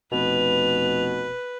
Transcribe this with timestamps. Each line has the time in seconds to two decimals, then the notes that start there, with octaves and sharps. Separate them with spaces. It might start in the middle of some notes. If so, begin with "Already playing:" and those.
0.12 F1 B2 B4 F7